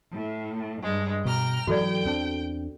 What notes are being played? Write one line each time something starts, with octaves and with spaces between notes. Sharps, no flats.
A2
G2 G#3
B2 G5 A#5 F6
G#2 E3 F#3 F#4 A4 D5 G5
E2 C4 D4